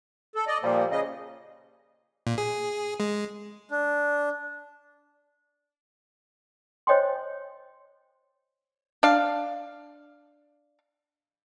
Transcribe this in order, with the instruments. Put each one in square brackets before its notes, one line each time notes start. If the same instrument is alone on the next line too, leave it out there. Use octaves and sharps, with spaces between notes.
[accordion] A4
D5 D#5
[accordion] A#2 A#3 [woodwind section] F3 G3
[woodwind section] C#3 [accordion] D#5
[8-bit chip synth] A#2
G#4
G#3
[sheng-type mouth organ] D4
[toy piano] C5 C#5 D#5 G5 G#5 C6
[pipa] D4 F5